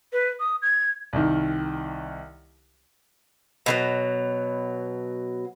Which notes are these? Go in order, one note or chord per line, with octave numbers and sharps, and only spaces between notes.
B4
D#6
G#6
C2 D#3
B2 D#3 F#3